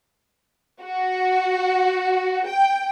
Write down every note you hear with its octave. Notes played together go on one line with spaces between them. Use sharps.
F#4
G5